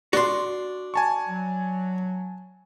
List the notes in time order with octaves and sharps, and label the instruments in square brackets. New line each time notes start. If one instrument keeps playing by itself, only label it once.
[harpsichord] D4 [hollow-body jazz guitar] F#4 C6
[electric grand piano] G#5 A5 C#6
[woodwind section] F#3